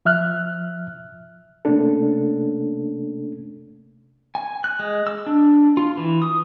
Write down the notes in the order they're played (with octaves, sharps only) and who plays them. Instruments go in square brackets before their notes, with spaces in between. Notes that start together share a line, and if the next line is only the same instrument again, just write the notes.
[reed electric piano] F3 E5 F6 F#6
C3 A3 A#3 C#4 D4 A4
[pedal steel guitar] G#5
F#6
G#3
E6
D4
F4
E3
D#6